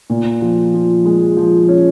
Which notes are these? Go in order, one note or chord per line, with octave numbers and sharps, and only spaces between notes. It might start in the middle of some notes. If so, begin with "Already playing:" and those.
A#2
F3
F3
G#3
F3
C#4